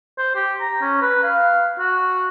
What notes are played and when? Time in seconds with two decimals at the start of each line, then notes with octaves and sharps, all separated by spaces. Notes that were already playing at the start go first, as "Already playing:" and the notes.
0.18 C5
0.35 G4
0.60 A#5
0.81 C#4
1.02 B4
1.23 F5
1.79 F#4